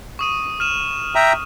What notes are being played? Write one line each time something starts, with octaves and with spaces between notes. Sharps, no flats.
C#6 D#6 D#7
F6 D#7 E7
E5 G5 A#5